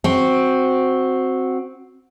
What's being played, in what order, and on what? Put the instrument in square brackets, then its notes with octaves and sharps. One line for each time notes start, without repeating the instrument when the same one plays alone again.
[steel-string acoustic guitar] C4 F#4